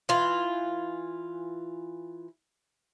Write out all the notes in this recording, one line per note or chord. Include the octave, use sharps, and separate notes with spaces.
E3 F4